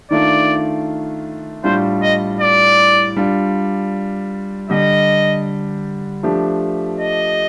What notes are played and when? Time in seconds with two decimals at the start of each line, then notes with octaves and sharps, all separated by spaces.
0.11 D#3 A3 D4 F4 D5
1.64 A2 G3 D4 F4 C5
2.02 D#5
2.41 D5
3.16 G3 D4 F4
4.70 D3 G3 D4 G4 D#5
6.23 F3 A3 D4 G4
6.99 D#5